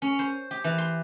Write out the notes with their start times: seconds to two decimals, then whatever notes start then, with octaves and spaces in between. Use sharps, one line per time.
0.02 C#4
0.19 C5
0.51 G4
0.64 E3
0.78 C6